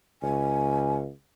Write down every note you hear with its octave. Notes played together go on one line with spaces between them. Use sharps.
C#2 G#5